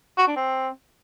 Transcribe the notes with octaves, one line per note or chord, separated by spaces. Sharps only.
F#4
D4
C4